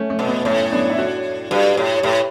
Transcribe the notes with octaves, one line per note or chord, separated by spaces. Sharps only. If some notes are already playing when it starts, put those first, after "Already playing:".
Already playing: A3 C#4
A3
B2
B3
A2 A3 C#4
B3 D4
E4
D4 F#4
G2 F#4 A4
A2 G4 B4
C#5
A2 G4 B4